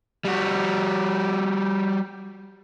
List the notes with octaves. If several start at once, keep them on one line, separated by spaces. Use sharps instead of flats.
G3 F#4